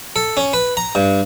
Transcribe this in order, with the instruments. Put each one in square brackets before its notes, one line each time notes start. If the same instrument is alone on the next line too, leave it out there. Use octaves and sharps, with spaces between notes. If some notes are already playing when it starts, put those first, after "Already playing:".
[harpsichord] A4
C#4
B4
A#5
G2